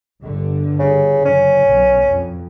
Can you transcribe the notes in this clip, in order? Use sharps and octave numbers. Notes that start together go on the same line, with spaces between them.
G1 G2 D3
C#3
F#1 F#2 C#4
B1 B2
F2